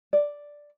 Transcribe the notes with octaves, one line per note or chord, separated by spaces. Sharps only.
D5